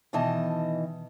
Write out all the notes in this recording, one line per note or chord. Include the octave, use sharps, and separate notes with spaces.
B2 D#3 E3 D#5 A5